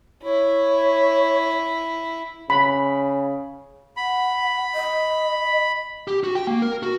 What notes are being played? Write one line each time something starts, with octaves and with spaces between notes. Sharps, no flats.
E4 C#5
C#3 B5
F#5 B5
D#5
G4
F#4
G5
A#3
A#4
F#4